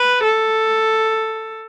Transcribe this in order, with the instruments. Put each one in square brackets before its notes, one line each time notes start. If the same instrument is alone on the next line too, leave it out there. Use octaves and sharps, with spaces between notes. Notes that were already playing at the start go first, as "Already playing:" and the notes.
Already playing: [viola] B4
A4